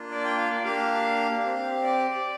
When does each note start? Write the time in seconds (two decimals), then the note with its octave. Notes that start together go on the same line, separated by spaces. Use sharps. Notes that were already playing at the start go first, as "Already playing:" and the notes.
Already playing: A#3 D4 F4
0.11 D5
0.25 G5
0.38 F5
0.50 D5
0.64 A#3 D4 G4 F5
1.44 C4 G4
1.83 D5